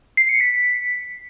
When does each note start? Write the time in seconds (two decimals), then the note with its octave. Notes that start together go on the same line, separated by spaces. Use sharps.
0.17 C7
0.29 C#7
0.41 B6